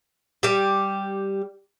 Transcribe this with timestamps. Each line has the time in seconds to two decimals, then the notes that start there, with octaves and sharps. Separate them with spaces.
0.43 G3 G4